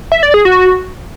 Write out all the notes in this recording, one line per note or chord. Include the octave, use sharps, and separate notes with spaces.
E5
D5
G#4
F#4